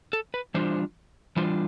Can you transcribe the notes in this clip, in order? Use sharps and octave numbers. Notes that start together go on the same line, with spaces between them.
A4
B4
E3 G3 D4 F4 C5
E3 G3 D4 F4 C5